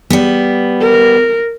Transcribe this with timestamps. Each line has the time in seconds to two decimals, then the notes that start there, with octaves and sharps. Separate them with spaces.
0.10 G3 B3
0.81 A#4